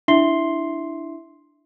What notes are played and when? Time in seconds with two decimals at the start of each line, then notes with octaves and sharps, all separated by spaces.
0.08 D4 E4 E5 C6 C7 G7